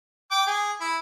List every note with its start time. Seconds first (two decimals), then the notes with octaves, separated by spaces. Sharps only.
0.31 G5 D6
0.47 G#4
0.81 E4